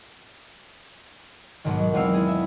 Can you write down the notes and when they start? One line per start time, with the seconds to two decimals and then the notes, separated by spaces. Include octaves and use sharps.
1.64 B1 G#2 D#3
1.79 F#3
1.94 E2 G#3 C4 F5 E6
2.14 E4 G#4
2.28 E5